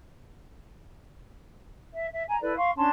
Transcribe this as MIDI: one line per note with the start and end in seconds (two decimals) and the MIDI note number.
1.93 2.08 76
2.13 2.23 76
2.26 2.38 80
2.26 2.38 82
2.40 2.55 64
2.40 2.55 69
2.40 2.55 71
2.40 2.55 74
2.56 2.70 77
2.56 2.70 84
2.56 2.70 85
2.76 2.91 61
2.76 2.91 62
2.76 2.91 81
2.76 2.91 84